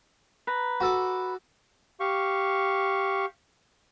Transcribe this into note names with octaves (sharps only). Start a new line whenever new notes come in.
B4 A#5
F#4 A4 D6
G4 F5 C#6